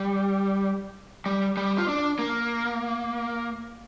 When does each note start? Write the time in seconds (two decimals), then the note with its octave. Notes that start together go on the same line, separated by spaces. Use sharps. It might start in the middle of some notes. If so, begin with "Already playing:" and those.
Already playing: G3
1.26 G3
1.57 G3
1.78 F4
1.88 D4
2.19 A#3